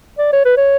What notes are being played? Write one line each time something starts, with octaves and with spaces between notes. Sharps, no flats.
D5
C#5
B4
C#5